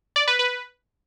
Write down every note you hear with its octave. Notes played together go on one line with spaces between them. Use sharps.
D5
B4
B4